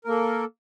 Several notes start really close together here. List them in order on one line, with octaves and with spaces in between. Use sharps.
A#4 A#3 A4